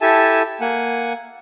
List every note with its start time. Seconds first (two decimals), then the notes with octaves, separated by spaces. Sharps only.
0.01 E4 G4 A4 E5 G#5 A5
0.61 A#3 F#5 G#5